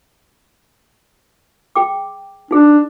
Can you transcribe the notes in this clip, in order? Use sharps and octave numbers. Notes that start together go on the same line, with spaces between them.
G#4 G5 D6
D4 D#4 G#4